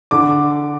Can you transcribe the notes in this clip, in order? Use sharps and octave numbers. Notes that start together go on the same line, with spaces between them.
D3 D6